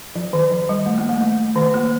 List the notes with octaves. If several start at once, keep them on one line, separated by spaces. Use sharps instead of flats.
F3
D#3
F3
G3
A3
A#3
A3
A3
D#3
A#3